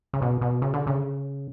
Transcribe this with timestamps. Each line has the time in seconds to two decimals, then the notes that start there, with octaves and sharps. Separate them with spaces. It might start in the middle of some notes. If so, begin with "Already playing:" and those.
0.13 C#3
0.22 B2
0.41 B2
0.62 C#3
0.74 D3
0.87 C#3